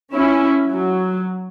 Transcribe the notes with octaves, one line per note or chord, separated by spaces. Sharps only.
C#4 E4
F#3